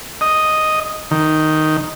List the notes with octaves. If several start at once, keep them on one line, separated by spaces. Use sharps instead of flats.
D#5
D#3